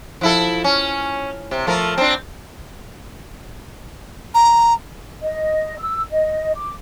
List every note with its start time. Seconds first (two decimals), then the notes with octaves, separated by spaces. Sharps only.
0.21 F3 E4 A4
0.64 C#4
1.51 C3
1.67 F3 A3 A#4
1.98 C4 D4
4.34 A#5
5.22 D#5
5.80 E6
6.11 D#5
6.56 D6